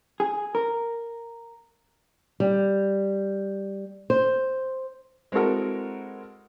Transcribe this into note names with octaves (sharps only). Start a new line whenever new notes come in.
G#4
A#4
G3
C5
G#3 C4 E4 F#4 A4 A#4